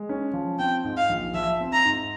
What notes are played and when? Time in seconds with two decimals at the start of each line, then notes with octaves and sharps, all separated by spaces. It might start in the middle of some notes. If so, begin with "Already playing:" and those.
Already playing: G#3
0.09 C#4
0.33 F3
0.59 C4 G5
0.85 G#2
0.97 F5
1.09 A#1
1.34 F3 E5
1.60 C4
1.73 A#5
1.85 G#2